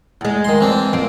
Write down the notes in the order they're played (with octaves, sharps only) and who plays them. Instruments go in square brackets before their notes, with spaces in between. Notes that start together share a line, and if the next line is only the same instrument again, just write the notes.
[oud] E2 G#3
[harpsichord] D#3 C6
E3 C4 D4
[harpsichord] F2 [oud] C4